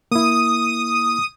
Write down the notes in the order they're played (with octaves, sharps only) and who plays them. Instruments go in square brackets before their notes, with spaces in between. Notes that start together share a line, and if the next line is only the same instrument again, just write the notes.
[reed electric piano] A#3 E4 [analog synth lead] D#6